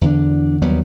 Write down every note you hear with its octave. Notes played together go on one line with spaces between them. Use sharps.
E2 D3 D4
D#2 F#3 G3 B3